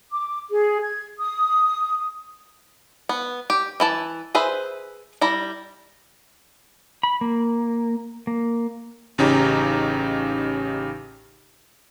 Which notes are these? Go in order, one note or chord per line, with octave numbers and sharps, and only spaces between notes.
D6
G#4
G#6
D#6
B3
G4
E3 E4 A5
G#4 B4 C5 E5
G3 E4 A#5
B5
A#3
A#3
A1 C#3 C#4 D#4 G4 A#5